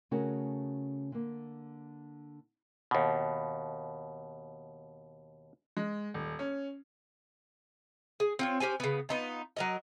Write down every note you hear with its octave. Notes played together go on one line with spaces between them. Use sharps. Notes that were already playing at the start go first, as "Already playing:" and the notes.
C#3 A3 C#4 F#4 G#4 A#4
D3 A#3
D#2 B2
G#3
D#1
C#4
G#4
C4 F4 C#5
C#4 G4 C5 G#5
C#3 B3
B3 D#4 F4
F#3 A#4 D#5